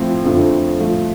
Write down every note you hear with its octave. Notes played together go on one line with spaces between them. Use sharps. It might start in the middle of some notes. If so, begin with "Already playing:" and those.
Already playing: A2 F3 C4
F2 D3 F3 A3
A2 F3 A3